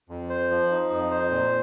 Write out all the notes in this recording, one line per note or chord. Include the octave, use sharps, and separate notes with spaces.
F2
C5
F3
D#4
F2
C5
A#2